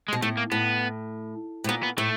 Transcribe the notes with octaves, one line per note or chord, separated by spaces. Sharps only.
G#3
B2
A2 A3
A#3
A2 B3
A2
A#2 B3
B3
A2 A3